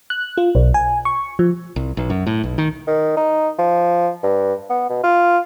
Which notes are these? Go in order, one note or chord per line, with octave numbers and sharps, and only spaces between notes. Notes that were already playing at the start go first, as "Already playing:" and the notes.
F#6
F4
B1
G#5
C#6
F3
C2
B1
F#2
A2
B1
D#3
D#3
D#4
F3
G2
B3
B2
F4